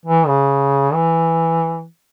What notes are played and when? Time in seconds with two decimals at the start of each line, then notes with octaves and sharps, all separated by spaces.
0.06 E3
0.27 C#3
0.94 E3